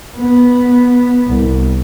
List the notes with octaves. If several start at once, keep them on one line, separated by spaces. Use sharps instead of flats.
B3
C2